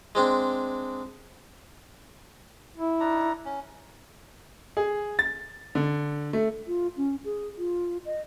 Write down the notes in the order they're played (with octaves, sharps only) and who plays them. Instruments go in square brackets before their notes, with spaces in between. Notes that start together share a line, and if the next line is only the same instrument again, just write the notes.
[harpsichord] G#3 C4 D4
[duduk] E4
[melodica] D4 D#4 A#5
C#4
[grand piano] G#4
A6
D3
A3
[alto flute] F4
C#4
G#4
F4
D#5